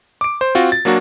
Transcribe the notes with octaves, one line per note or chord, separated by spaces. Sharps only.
D6 D7
C5
C4 F4 F#4
A6
F#3 A#3 D4 F#4